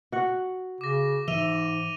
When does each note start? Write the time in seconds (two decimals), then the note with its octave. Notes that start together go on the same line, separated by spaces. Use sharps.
0.12 F#4 F#5
0.81 C#3 D6 A#6
1.28 G#2 E3 E5 D#7 F7 G7